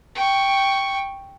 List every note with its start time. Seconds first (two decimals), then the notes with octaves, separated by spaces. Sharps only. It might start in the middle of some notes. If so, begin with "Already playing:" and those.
0.15 G5 C#6